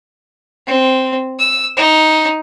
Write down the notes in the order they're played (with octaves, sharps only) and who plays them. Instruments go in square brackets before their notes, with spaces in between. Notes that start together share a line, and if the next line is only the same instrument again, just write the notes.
[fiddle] C4
E6
D#4